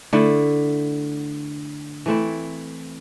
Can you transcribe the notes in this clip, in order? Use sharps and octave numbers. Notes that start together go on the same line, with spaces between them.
D3 A3 E4
E3 A3 C4 E4